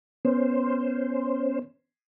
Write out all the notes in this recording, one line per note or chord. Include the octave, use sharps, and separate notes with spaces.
B3 C#4 C5